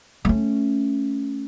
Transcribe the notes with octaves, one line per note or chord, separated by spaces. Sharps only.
A3 C#4